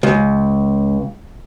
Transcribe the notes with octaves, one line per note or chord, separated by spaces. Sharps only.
C#2